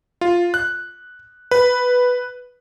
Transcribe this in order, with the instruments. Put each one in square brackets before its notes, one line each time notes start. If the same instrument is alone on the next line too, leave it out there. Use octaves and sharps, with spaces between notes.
[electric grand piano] F4
F#6
B4